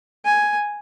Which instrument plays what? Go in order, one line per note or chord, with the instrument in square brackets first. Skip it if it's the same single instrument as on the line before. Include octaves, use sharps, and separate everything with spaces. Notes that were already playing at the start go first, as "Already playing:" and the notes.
[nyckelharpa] G#5